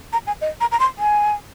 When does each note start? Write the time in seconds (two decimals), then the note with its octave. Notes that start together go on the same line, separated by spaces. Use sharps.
0.13 A#5
0.27 G#5
0.41 D#5
0.61 A#5
0.72 A#5
0.80 C6
0.99 G#5